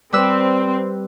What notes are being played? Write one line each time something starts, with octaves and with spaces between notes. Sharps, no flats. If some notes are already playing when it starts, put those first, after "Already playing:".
G3 C4 B4 E6